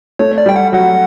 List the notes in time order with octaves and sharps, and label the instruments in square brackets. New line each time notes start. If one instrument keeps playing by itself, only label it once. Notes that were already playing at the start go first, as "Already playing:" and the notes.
[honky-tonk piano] A3 [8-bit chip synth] C#5
[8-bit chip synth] D5
[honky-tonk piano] G3 [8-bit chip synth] G5
[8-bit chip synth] F#5
[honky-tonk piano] F#3 [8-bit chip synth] F#5